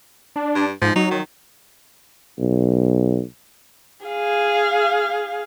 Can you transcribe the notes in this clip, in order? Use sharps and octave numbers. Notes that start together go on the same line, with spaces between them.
D4
G2
G#2 F3
F#3 D#4
D#3
B1
G#4 F5